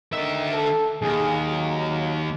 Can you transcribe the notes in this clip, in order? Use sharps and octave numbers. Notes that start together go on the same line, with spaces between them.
D3 D#3 E5
A4
D#2 D#3 G#4
F#3